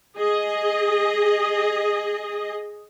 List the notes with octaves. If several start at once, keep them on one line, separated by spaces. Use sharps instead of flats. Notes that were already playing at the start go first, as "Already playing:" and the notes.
G#4 D#5